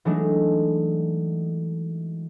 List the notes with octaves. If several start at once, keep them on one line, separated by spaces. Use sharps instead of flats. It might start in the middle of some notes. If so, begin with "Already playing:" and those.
E3 F#3 G#3 A3 D4 D#4